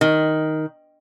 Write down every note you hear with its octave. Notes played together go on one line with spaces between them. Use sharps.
D#3